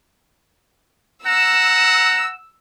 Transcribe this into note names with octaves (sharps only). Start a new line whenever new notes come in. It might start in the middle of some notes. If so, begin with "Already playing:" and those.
F#5 A#5 E6